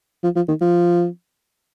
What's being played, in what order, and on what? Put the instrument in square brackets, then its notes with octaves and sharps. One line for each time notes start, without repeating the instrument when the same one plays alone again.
[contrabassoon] F3
F3
D#3
F3